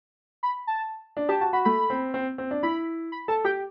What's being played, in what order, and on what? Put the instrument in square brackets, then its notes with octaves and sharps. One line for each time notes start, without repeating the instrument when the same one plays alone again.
[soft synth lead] B5
A5
[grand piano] D4
[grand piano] G4 [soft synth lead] A5
[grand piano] F#4 [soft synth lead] A5
[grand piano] F#4 [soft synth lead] B5
[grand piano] A3 [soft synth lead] B5
[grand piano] C4
C4
C4
D4
[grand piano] E4 [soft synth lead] B5
[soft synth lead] B5
[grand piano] A4 [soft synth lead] A5
[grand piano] G4 [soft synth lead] G5